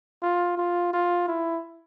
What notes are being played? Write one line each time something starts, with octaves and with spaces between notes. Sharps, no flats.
F4
F4
F4
E4